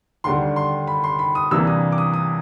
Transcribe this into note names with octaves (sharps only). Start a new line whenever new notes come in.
D#2 D3 G3 C6
C6
B5
C6
B5
D#6
C3 E3 G3 A#3 D4 E6
D#6
D6
D#6
D#6